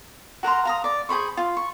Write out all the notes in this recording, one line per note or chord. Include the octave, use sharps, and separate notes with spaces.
F#4 A#4 A#5 C6
F5 A#5 D#6
D5
G#4 C5 B5 C#6
F4
C#6